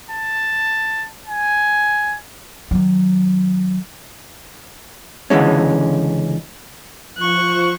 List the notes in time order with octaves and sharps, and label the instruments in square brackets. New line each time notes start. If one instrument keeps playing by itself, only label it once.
[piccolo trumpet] A5
G#5
[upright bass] D#3 F#3
[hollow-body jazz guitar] C#2 D3 E3 G#3 C#4
[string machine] F3 F4 C5 [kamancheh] C#6 F#6